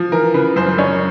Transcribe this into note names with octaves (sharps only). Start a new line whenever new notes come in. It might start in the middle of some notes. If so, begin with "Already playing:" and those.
Already playing: F3
E3 A#4
C#3 B4
F#2 C5
F#2 C#5